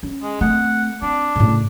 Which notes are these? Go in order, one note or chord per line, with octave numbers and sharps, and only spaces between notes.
C#4
G#3
A3 C4 F#5
C4 D4
A2 C#3